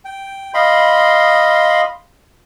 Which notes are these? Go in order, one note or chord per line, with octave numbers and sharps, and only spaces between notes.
G5
D#5 F5 B5 C6